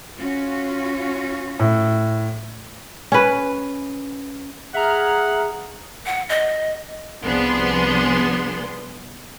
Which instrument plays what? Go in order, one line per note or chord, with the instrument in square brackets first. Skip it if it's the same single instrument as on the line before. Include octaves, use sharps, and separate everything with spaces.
[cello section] C#4 F4 F#4
[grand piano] A2
[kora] C#4 B4
[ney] G#4 [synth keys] E5 A#5 F6 [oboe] F#5
[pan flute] F#5
D#5
[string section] C2 F3 B3 D4 G#4 C6